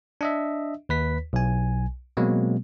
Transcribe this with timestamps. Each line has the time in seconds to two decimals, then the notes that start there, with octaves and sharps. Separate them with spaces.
0.21 D4 D#5 E5
0.89 D#2 B4 B6
1.33 B1 G#5
2.17 B2 F#3 G#3 A#3 C4